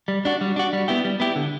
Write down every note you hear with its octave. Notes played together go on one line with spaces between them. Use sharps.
G3
D4 F#4
G3
D4 F#4
G3
B3 E4 G4
G3
B3 E4 G4
D3